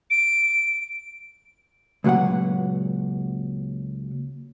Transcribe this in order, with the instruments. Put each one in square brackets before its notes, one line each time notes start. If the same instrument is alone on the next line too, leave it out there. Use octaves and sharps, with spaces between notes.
[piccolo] D7
[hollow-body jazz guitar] C#2 A#2 F#3 B4 F#5